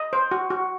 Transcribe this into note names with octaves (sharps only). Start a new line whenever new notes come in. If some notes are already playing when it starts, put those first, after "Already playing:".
Already playing: D#5
C5
F#4
F#4